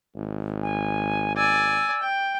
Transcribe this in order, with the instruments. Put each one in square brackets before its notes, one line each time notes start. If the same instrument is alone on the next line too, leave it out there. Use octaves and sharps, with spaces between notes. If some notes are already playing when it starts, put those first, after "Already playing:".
[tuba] G#1
[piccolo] G#5
[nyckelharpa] D5 G#5 [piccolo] E6
[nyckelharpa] G5